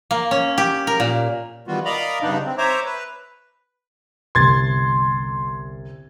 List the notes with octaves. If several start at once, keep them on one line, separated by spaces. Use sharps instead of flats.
A#3
C#4
G4
A#4
A#2
D#3 E3 G3 B3 F4 F#4
A#4 D5 D#5 F5 A#5 B5
G2 C#3 B3 D4 D#4
C4
C5 C#5 E5 A#5 D6
B4
G1 C2 C6 G#6 A6